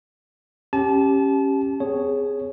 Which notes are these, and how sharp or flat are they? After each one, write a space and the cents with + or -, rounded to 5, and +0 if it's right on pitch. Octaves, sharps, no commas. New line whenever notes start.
C#4 -15 G4 +0 A5 -30
C4 -35 G#4 +0 C#5 +0